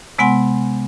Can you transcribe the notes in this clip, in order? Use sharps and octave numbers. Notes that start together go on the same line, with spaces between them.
C3 G#3 B3 F#5 G#5 C6